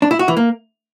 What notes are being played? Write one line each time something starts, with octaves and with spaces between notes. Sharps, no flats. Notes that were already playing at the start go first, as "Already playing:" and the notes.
D4
E4
F#4
E3
A#3